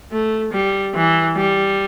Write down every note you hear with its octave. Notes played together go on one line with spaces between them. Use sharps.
A3
G3
E3
G3